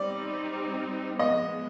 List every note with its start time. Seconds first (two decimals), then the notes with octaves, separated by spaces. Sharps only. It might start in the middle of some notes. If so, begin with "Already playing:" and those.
Already playing: G3 C4 D#4 D5
1.19 F3 G#3 B3 D#5